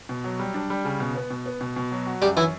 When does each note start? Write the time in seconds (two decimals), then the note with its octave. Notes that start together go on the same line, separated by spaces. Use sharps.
0.09 B2
0.24 F#3
0.39 G3
0.54 D4
0.70 G3
0.85 C#3
1.00 B2
1.15 B3
1.30 B2
1.46 B3
1.61 B2
1.76 B2
1.91 F#3
2.06 F#4
2.22 F#2 G3 G4
2.37 E3 C#4 E4